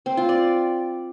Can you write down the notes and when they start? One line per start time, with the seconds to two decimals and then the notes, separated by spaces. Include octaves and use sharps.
0.06 C4
0.17 F4
0.29 D5